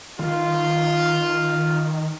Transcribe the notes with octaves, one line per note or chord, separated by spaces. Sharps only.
D#3 F4